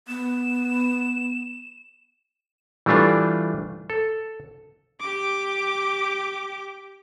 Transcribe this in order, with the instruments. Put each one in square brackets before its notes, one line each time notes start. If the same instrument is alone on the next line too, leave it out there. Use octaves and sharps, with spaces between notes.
[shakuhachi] B3 [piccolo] E7
[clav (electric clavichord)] E3 G3 A3 D4 F4
A4
[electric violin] G4 D6